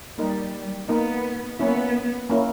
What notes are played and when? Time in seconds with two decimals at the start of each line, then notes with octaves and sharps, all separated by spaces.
0.18 G3 A#3 D#4 A#4 D#5
0.88 A#3 B3 D#4 A#4 D#5
1.59 A#3 B3 C#4 E4
2.30 A#3 C#4 E4